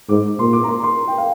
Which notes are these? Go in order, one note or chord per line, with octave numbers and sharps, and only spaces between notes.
G#2 D6
A#2 C6
D6
A#5
C6
C6
G5
F5